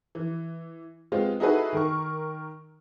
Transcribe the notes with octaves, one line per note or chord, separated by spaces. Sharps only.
E3
G#3 B3 C4 F4
D#4 E4 F#4 G#4 A4 B4
D#3 A#4 C#6